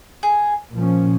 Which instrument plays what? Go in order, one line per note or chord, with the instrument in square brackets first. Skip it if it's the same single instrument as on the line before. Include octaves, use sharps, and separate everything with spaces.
[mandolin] G#4
[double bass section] A#2 F3 C#4